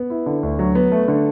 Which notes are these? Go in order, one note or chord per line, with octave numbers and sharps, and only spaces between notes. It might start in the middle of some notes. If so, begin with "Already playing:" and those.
Already playing: B3
E4
D3
D2
F#3
B3
A3
D3